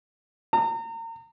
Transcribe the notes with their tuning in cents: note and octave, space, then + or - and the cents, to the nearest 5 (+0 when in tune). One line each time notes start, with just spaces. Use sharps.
A#5 -35